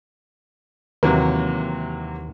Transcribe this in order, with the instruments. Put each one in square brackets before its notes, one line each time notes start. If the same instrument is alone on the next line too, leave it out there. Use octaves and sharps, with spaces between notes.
[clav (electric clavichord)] D#2 E3 [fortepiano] C3 F#3 A#3